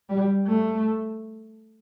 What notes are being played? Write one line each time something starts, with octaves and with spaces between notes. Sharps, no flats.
G3
A3